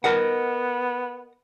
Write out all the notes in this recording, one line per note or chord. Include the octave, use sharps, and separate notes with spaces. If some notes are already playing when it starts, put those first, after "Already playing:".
B3 A#4 D#5 F#5